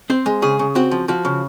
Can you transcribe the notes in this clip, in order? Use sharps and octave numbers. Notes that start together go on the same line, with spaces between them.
C4 C5
G#3
C#3 G#4
C#3
C4 F#4
F3
F3 F#4
C#3